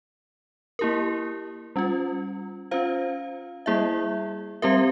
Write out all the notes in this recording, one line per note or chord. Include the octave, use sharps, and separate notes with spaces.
A#3 E4 G4 A#4
G3 C#4 F4
C#4 F4 C5 F5
G3 A#3 E4 G#4 E5
G3 C4 G4 A#4 E5